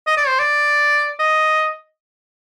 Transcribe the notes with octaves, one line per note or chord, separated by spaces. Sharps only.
D#5
D5
C5
D5
D#5